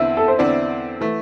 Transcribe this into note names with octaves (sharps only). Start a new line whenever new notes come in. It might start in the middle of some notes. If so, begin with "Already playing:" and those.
Already playing: E2 D3 C4 E4 E5
A4
C5
E2 D3 C4 E4 D5
E3 A3